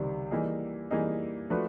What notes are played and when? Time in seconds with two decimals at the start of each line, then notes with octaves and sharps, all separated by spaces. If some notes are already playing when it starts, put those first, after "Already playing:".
Already playing: C#2 C3 D#3 G3
0.31 E3 G3 A#3 D#4 G#4
0.91 E3 G3 A#3 D#4 G#4
1.50 F3 A3 D4 F#4 B4